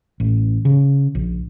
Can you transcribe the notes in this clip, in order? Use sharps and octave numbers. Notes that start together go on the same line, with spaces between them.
A1
C#3
A#1